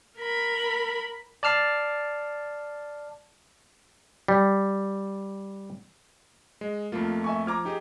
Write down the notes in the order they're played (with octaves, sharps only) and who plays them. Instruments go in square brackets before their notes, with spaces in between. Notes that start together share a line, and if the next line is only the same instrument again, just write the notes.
[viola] A#4 B5
[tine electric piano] D5 A5 F6 C7
[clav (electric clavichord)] G3
[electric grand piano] G#3
[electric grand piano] F2 A3 A#3 [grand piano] F4
[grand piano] E5 G#5 C#6
[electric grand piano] F3 G#6 [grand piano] A#5 D6 F6
[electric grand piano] D#4 G4 G#4